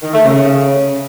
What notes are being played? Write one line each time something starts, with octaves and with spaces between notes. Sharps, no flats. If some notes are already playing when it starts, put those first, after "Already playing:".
D#3
A3
C#3